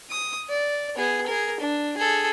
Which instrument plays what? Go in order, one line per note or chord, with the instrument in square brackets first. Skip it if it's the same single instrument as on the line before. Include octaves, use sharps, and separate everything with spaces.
[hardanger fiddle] D#6
D5
B3 G#4
G#4 A#4
D4
G#4 A4